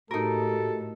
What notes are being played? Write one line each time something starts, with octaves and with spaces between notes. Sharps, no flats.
A2 D#4 F#4 G4 A4 A#4